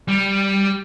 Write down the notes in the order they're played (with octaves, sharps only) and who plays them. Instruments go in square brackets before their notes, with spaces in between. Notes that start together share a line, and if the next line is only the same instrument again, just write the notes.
[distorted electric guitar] G3